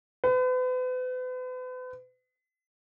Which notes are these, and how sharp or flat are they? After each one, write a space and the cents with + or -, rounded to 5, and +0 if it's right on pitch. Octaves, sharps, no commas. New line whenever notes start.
B4 +40